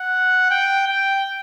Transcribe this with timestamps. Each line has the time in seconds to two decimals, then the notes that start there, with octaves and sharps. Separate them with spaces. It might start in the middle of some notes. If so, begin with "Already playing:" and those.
Already playing: F#5
0.51 G5
0.87 G5